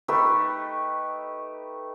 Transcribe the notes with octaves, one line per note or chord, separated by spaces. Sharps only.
A3 D#4 G4 B4